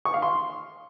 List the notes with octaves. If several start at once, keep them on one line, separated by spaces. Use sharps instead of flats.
C#6
F5
C6